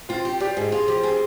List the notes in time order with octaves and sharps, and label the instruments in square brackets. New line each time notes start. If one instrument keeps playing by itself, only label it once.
[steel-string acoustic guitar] C4 [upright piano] F4
[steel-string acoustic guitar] G4
[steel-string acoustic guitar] G3 [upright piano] G4
[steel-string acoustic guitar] G#2 [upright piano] G#4
[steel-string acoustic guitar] F4 [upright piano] G#4
[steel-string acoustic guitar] F3 [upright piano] G4
[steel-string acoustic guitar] C4 [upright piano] G#4